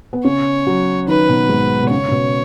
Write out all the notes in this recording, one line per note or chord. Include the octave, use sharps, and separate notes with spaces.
B3
C#3 C#4 C#5
F#3 F#4
D#3 D#4 B4
B2 B3
G#2 G#3
B2
C#3 C#5
C#3
B2